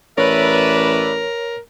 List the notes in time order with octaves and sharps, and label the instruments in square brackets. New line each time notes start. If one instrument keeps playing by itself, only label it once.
[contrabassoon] A1 [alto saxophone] A#4 [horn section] B4 D5 E5 [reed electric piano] C#5